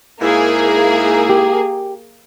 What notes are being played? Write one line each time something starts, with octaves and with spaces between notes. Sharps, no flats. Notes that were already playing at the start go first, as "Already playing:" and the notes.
G#2 A#3 E4 G#4
G4